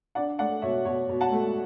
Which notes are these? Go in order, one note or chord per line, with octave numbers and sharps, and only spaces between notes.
D4 D5 F#5
A3 D5 F#5
B2 C#5 E5
B2 C#5
B2
F#5 A5
A3